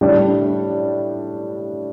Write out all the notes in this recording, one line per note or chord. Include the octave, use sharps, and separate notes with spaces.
A2 G3 D4 G4